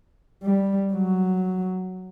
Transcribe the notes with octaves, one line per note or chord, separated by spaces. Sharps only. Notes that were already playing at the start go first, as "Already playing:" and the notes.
G3
F#3